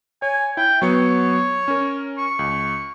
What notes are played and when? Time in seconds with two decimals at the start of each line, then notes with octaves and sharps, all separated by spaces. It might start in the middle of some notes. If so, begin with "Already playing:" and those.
0.22 C#5 G#5
0.57 E4 G5
0.82 F#3 B3 C#5 C#7
1.68 C#4 A#4
2.18 C#6
2.39 C#2